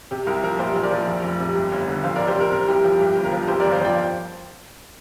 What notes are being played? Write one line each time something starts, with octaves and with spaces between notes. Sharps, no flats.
C3 G4
C2 A#4
F3 A#4
A#2 G4 C5
A#1
A#4 D5
F3
F2
F1
C3
G2
G1
D3
F2 C5 F5
A#4 D5
F1
G4 C5
C3 A#4
C3 A#4
C2 G4
F3 G4
G2 G4
G1
A#4
F3
F2 G4 C5
A#4 D5
G1
C5 F5
F3 D5 G5